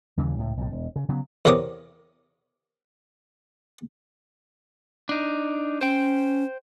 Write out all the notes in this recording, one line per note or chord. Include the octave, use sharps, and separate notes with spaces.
D#2 C#3 E3 G3
C#2 A2
B1 A2
E1
C#3
C#3 F#3 B3
E2 C3 A#4 C#5 D6 D#6
D4 D#4
C#4 C5 G5